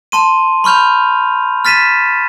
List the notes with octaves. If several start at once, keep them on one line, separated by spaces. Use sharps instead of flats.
A5 C6 D#7
B5 C#6 F6 G6 F7
F6 A6 B6 D#7 E7